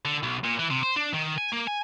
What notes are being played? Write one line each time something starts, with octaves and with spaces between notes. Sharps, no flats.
D3
B1
A#2
E3
C3
C5
D4
D#3
G#5
A#3
G#5